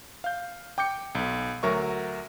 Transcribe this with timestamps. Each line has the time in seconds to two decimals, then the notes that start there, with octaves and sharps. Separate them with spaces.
0.24 F5 G6
0.78 G5 D6 G6 C#7
1.15 B1
1.63 D2 F#3 A#4 E5 C#6